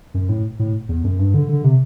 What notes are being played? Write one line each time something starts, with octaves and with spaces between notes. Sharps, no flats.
F#2
A2
A2
E2
F#2
G2
D3
D3
C3